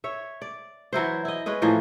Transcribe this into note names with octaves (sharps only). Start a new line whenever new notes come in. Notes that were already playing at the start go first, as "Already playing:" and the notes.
C#5 E5
D5
E3 F#3 E4 C5
E4 D#5
G#3 C#4 B4 D#5
A2 E3 F3 A#3